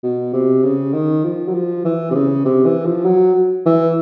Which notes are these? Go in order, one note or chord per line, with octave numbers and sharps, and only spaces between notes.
B2
C3
C#3
D#3
F3
F#3
F3
E3
C3
C#3
C3
E3
F3
F#3
E3